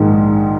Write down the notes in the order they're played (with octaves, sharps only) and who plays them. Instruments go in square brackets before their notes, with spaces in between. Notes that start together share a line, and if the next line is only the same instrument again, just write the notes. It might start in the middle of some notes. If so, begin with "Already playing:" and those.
Already playing: [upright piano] A#1 G#2 D#3 G#3